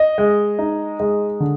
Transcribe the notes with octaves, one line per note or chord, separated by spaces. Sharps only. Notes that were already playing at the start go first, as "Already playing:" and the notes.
Already playing: D#5
G#3
D#4
G#3
D3